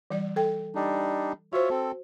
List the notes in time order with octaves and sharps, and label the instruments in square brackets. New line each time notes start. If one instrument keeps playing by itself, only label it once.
[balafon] E3 G3 D5
A4 G5
[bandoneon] G3 D4 D#4
[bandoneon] F4 C#5 E5 [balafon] F#4 C5
[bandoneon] C4 A4